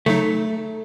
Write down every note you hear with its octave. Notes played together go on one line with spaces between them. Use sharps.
C#3 F#3 A3 D#4